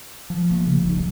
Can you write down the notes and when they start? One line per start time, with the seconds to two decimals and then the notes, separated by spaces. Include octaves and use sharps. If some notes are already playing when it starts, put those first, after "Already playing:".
0.30 F3
0.50 A3 A#3
0.65 C#3
0.82 E1 D#4
0.96 D3 F#3